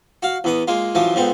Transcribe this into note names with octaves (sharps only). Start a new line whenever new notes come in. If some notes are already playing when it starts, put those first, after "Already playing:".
F#4 F5
E2 B3 D#6
G#3 A#3 F4
F#2 E3 F3 F4
F2 G#2 B3 C4